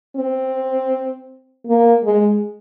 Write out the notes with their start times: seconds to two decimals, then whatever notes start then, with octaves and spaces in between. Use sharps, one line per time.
0.16 C4
1.67 A#3
2.04 G#3